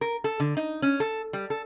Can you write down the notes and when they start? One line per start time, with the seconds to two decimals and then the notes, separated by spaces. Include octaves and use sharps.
0.01 A#4
0.24 A4
0.40 D3
0.57 D#4
0.82 C#4
1.00 A4
1.33 G3
1.50 A4